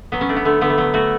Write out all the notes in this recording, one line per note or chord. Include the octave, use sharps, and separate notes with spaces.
F#3 B3
C#4
A3 D4
B3
D3 A3
D3 B3
A3
F#3 B3
A3 F#4